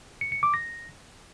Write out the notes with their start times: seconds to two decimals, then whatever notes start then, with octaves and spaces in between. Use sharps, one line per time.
0.21 C#7
0.32 C#7
0.43 D6
0.54 A#6